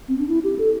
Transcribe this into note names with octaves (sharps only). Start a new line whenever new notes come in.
C4
D4
E4
G4
A4